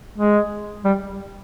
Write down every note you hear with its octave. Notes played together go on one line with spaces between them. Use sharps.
G#3
G3